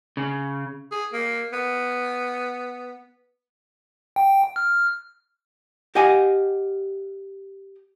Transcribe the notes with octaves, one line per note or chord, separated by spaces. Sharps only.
C#3
G#4
A#3
B3
G5
F6
G4 D#5 F5 F#5 G#5